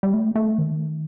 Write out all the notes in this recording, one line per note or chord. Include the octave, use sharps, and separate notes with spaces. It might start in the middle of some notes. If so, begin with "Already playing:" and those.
G3
A3
A3
D#3